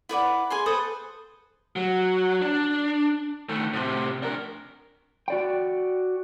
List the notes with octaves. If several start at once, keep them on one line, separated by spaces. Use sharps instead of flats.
E4 B4 D5 F#5
G#4 G#5 C6
A4 B4 C5 D#6
F#3
D4
D#3 A3
A2 C3
D4 A#4
F#4 D5 G5